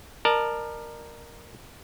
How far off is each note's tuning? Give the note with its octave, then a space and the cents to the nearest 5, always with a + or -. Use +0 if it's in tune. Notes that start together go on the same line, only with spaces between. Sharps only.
A#4 +0 D5 +40 A5 +0